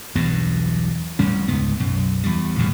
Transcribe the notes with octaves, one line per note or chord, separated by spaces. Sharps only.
B1 E2 G2 B2
A1 E2 G3 C#4
C#2 G#2 B3
B1 F#2
E2 G3
D#1 D2 A2 G3